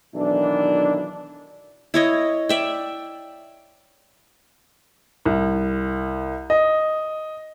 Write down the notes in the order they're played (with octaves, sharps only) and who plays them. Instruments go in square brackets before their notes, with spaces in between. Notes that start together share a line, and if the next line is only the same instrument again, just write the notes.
[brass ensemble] B1 D#3 E3 D4
[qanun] E4 C#5 D#5
D5 E5 G5
[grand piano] C2
D#5